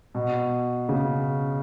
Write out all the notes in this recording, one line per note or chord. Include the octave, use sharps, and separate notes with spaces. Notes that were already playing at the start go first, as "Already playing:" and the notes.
B2
C#3